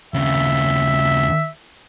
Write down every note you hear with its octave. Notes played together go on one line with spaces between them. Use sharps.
D#2 C#3 E5